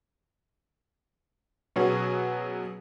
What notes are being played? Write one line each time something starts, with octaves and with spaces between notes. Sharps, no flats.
B2 F#3 B3 C#4 F#4 G#4